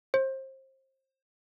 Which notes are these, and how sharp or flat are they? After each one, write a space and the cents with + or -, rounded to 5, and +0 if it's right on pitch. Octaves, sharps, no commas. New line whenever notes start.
C5 +30